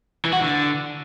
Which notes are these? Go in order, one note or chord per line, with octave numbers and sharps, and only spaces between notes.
E3
F#4
D3